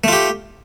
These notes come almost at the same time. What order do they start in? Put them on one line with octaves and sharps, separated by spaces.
A3 F4 G4